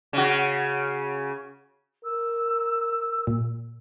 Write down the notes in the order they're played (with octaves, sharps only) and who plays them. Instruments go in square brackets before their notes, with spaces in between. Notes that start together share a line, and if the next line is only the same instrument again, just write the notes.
[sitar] C#3 F#4
[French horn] A#4 [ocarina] E6
[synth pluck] A#2